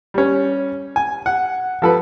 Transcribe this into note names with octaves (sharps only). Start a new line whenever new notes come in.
G3 C#4
G#5
F#5
F3 A4 B4